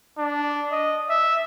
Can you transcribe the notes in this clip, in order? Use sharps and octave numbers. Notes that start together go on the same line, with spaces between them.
D4
D#5
E5